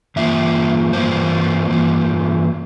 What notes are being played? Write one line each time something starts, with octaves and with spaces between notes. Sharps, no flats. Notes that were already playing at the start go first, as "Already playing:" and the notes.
G2 E3 A#3 F4 E5
G2 E3 A#3 F4 C5
G2 E3 A#3 F4